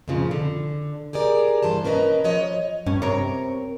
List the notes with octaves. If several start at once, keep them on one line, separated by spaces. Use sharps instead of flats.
F2 A2 C#3 F3
D3
G4 G#4 A#4 D5
G2 E3 C5 A5
C#4 A#4 B4 D5 D#5
F3 C#5 D#5
G2 C#4
C3 A#4 C#5